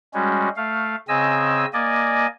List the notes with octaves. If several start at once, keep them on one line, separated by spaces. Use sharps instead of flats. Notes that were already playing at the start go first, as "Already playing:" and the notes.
G3 G#3 C#4 F#4
A3 F5
C#3 C4 D#5 G#5 E6
A#3 D5 D#5 G#5